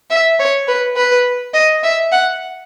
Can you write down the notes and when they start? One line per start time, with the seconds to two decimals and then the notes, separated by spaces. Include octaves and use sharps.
0.10 E5
0.40 C#5
0.68 B4
0.97 B4
1.54 D#5
1.83 E5
2.12 F#5